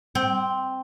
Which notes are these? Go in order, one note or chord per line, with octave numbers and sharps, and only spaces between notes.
C4